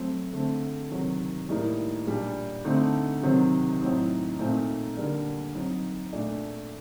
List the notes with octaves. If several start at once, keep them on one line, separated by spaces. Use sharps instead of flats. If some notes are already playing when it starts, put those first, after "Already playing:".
Already playing: F#3 A3 C4
D3 A3 C4
C3 D#3 F#3
A2 G3 A#3 D#4
A#2 G3 D4
D3 A3 C4 D#4
C3 D#3 F#3 C4
A2 F#3 C4 D#4
A#2 A3 C4 D#4
D3 G3 A#3 D4
F#3 C4 D#4
A#2 A3 D4